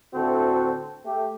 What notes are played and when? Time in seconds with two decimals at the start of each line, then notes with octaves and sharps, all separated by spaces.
0.14 D2 A2 D3 C4 F#4 A4
1.05 A3 G4